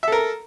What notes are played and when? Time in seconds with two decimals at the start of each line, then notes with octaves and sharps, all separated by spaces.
0.03 E5
0.08 A4
0.12 A#4